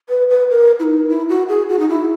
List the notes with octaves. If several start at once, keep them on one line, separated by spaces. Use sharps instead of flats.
B4
B4
A#4
E4
D#4
E4
F#4
G#4
F#4
D#4
E4